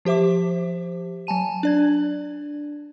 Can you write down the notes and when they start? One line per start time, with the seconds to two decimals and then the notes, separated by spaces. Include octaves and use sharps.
0.05 F3 G4 C5 E5 D6
1.27 F#3 G#5 A5 D#7
1.63 D4 D5 G#6